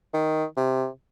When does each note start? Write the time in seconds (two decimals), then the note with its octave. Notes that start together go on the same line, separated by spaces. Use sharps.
0.14 D#3
0.57 C3